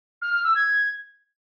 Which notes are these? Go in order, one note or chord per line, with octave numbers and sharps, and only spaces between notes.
F6
F6
E6
G#6